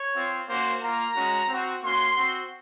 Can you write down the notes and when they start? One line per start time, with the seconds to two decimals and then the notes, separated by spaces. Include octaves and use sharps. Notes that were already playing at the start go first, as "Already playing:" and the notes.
Already playing: C#5
0.15 C4 F4
0.49 A#3 C#4 F#4 C5
0.82 A#3 F4 A#5
1.16 G#3 C#4 F#4
1.49 C4 F#4
1.83 A#3 C#4 F#4 C6
2.17 C4 F#4